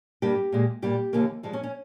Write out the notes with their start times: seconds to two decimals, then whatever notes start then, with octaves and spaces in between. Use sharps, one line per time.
0.22 G2 G3 A#3 G4
0.52 A#2 G#3
0.82 A#2 G3 A#3 G4
1.13 D#2 C#3 F3 A#3
1.43 G2 F3 G#3
1.53 C#4
1.63 C#4